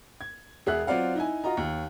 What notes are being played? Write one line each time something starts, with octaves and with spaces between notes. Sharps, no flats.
G#6
E1 G#4 E5 F#5 F#6
F#3 C4 F4 D5 F5 F#5
D#4 E4 G#5
F4 F#4 D#5 A#5
D#2